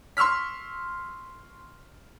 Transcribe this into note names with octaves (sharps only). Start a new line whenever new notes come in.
C6 C#6 E6 F6 B6